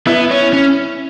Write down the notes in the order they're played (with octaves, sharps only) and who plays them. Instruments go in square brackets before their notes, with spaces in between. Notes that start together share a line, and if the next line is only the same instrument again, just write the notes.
[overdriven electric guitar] B3 [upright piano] E4
[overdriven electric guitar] C#4
C#4